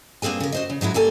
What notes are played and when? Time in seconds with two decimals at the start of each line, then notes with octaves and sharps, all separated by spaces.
0.22 G2 A#3 C4 G#4 G#5
0.40 C#3 A#4
0.52 F#4 C5 D#5
0.70 C#3
0.81 G#2 F#3 G#3 E4
0.94 G3 A#3 A4 G#5